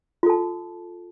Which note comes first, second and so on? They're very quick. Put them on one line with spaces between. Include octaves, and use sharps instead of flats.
F4 A4 A5